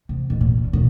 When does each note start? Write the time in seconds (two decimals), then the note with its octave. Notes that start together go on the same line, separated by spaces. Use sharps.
0.09 C3
0.30 B2
0.41 A#2
0.73 B2